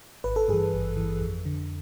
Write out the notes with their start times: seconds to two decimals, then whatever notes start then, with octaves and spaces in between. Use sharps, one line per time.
0.24 G#1 B4
0.36 A4
0.48 G2 E3 G#4
0.73 G#1
0.97 G2 E3
1.22 F2
1.45 D3